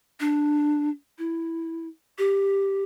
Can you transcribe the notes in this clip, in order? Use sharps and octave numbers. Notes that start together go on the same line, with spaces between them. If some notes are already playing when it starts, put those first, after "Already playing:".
D4
E4
G4